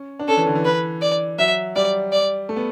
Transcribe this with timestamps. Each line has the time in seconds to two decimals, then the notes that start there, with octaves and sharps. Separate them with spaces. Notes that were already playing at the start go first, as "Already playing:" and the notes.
Already playing: C#4
0.19 D4
0.28 C#4 A4
0.37 E3
0.46 D3
0.55 E3
0.65 B4
1.02 D5
1.39 F#3 E5
1.76 G3 D5
2.12 D5
2.49 A3
2.56 B3